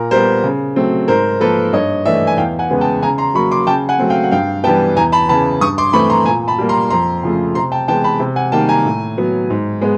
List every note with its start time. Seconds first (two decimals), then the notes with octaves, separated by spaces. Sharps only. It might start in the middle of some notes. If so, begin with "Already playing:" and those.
Already playing: A#2 A#4
0.11 G3 B3 A#4 C5
0.44 C#3
0.76 F#3 A3 C4
1.08 G#2 A#4 C5
1.40 F3 A#3 A4 B4
1.73 G2 C#5 D#5
2.05 E3 A3 D5 E5
2.27 G#5
2.37 E2 F5 G5
2.59 F#5 G#5
2.70 C#3 E3 G#3 B3
2.81 G5 A5
3.02 C#3 G#5 A#5
3.18 A#5 C6
3.34 F#3 A#3 B5 C#6
3.51 C6 D6
3.67 C#3 G5 A5
3.89 F#5 G#5
3.99 F#3 A3 C4
4.10 F5 G5
4.24 F#5
4.31 G2 F5 G5
4.64 E3 G3 B3 G5 A5
4.96 E2 G#5 A#5
5.12 A5 B5
5.29 C#3 E3 A5 B5
5.61 G2 C#6 D#6
5.78 C6 D6
5.93 E3 A3 C4 B5 C#6
6.10 A#5 C6
6.26 A#2 G#5 A#5
6.48 A5 B5
6.58 G3 A#3
6.69 A#5 C6
6.90 F2 A#5 C6
7.23 C#3 F3 A3
7.55 C3 A#5 C6
7.72 G5 A5
7.88 E3 G#3 B3 G5 A5
8.04 A5 B5
8.20 C3
8.36 F#5 G#5
8.52 D#3 G3 A#3 G5 A5
8.69 G#5 A#5
8.85 A2
9.18 F#3 B3
9.50 G#2
9.81 G#3 B3